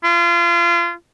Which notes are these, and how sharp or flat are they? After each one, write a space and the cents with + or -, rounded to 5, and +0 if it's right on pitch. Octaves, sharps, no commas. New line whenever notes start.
F4 -30